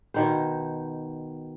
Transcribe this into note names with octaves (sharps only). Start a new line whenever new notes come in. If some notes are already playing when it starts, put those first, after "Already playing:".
B2 D#3 C5